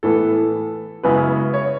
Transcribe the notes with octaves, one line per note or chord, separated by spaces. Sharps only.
A2 E3 B3 A4
F#2 C#3 G#3 B3 E4 B4
C#5